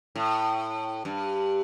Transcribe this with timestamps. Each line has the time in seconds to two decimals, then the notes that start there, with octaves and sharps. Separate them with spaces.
0.16 A2
1.05 G2